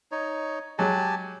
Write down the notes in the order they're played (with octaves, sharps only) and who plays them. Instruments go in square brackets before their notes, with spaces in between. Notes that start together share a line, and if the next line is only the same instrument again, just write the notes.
[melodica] D#4 C#5
[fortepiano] F#3 G#3 [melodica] G4 G#5 A5